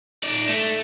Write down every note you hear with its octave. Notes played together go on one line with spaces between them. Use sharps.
D#4 D5
A3